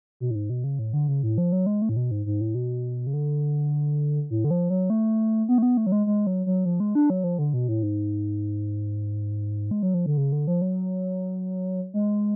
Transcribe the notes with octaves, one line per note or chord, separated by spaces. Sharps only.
B2
A2
G#2
B2
C#3
A2
D3
C#3
A2
F3
F#3
G#3
A3
A2
B2
G#2
G#2
A2
B2
C#3
D3
A2
D3
F3
F#3
A3
B3
A3
B3
A3
F#3
G#3
G#3
F#3
F#3
F3
G#3
D4
F#3
F3
D3
B2
A2
G#2
G#3
F#3
F3
D3
C#3
D3
F3
F#3
G#3